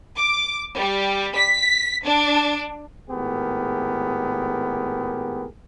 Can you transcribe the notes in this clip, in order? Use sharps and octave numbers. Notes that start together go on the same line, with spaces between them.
D6
G3
B6
D4
G#1 A2 B3 G4 G#4 A#4